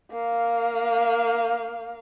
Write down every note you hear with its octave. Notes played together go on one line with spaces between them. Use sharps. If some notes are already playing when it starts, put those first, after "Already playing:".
A#3 F5